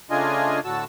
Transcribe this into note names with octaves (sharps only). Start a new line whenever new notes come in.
C#3 A3 D4 F4 D#5 G#5
A2 D3 F#4 A5 E6